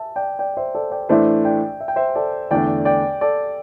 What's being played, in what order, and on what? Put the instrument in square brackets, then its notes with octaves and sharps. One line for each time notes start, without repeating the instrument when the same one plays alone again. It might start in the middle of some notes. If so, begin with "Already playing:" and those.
Already playing: [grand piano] E5 A5
D5 G5
D5 G5
C5 E5
A4 D5
D5 G5
[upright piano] A2 E3 A3 D4 C5 [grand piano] E5 A5
[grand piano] D5 G5
E5
G5
C5 E5
A4 D5
[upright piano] E2 D3 A3 D4 [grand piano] D5 G5
[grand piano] D5 G5
A4 D5